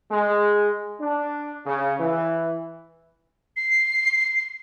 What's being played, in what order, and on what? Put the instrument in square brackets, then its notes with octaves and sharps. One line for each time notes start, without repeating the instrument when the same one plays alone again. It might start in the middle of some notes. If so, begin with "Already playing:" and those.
[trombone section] G#3
D4
C#3
E3
[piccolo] C7